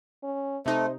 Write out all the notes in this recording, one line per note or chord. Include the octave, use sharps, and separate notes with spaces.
C#4
C3 A3 D#4 C5